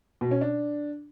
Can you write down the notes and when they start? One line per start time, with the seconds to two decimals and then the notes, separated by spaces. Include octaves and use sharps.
0.21 B2
0.31 C#4
0.41 D4